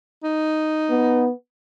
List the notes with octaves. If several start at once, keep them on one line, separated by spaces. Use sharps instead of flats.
D#4
B3